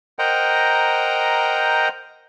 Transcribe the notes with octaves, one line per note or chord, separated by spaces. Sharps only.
A#4 C5 D#5 F#5 G5 A#5